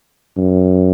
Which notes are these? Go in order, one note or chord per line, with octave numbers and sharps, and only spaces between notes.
F#2